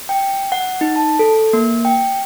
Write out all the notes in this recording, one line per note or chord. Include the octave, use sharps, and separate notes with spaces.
G5
F#5
D#4
A5
A4
A#3
G5